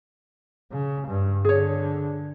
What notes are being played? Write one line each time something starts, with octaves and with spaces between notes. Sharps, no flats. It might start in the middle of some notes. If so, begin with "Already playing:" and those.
C#3
G2
D3 G#4 C#5